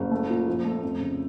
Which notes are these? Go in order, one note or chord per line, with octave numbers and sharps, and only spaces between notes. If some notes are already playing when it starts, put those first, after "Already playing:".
Already playing: F#1
A3
A#2
F3
A3
F2
C#3